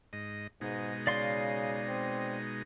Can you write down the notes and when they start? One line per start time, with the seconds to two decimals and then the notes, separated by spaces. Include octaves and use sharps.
0.13 G#2 D#5
0.61 G#2 B2 G#3 D#4
1.07 C#3 D5 F5 C6
1.88 C4